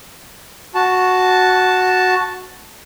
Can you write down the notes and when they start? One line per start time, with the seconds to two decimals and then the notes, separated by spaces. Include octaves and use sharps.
0.75 F#4 A5